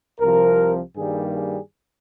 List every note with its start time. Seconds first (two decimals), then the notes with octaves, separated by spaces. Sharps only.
0.19 C2 C3 F3 A#4
0.95 G2 D#3 G3 A#3 G#4
1.34 G#4